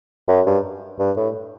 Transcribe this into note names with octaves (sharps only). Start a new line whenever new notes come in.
F#2
G2
G2
A2